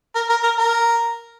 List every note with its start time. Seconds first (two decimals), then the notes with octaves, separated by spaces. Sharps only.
0.15 A#4
0.29 A#4
0.43 A#4
0.58 A#4